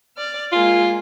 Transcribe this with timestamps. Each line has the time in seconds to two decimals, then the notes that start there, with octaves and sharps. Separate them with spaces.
0.16 D5 F6
0.53 G#3 A#3 F4 G#4